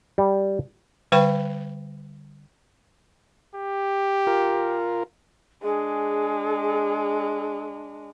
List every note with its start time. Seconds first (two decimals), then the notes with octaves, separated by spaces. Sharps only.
0.18 G3
1.12 D3 G3 B4 G5 B5 C#6
3.55 G4
4.27 F4 A#4
5.63 G#3 D4 G#4